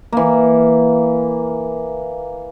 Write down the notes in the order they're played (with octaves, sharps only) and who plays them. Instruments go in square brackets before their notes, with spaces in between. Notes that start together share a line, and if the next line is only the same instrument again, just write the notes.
[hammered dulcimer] E3 A#3